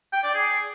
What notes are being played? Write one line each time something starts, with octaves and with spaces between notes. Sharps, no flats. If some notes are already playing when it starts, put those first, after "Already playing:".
G5
D5
G#4